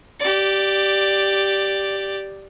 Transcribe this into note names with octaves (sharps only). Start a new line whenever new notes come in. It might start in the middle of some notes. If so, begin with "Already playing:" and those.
G4 D5